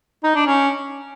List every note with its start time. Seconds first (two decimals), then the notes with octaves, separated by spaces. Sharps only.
0.24 D#4
0.35 D4
0.46 C#4